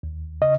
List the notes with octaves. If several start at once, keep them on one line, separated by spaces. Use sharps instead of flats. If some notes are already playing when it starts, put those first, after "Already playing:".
D#2
C#3 D#5